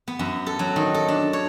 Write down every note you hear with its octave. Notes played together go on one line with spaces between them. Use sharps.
B3
F#2
A4
F#3
D#3
A4
D4
C#5